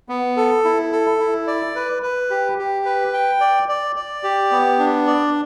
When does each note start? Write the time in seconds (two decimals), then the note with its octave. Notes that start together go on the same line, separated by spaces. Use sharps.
0.09 B3
0.37 A4
0.64 E4
0.92 A4
1.20 E4
1.47 D5
1.76 B4
2.03 B4
2.30 G4
2.58 G4
2.85 B4
3.13 G5
3.40 D5
3.68 D5
3.96 D5
4.23 G4
4.51 B3
4.79 D4
5.07 D5